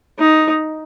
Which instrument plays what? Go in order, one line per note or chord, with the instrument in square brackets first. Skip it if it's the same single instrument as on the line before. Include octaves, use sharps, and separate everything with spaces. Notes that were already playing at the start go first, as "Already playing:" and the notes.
[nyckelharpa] D#4